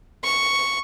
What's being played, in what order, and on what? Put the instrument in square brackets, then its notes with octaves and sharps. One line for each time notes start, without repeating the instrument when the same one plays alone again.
[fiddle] C#6